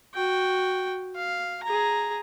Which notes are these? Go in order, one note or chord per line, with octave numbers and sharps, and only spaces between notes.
F#4 G5
F5
G#4 A#5